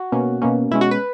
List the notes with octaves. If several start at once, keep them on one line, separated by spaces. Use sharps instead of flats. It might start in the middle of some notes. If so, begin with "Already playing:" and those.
Already playing: F#4
B2 A#3 C#4
B2 A#3 C#4
B2 G#3 C#4 E4
F#4
B4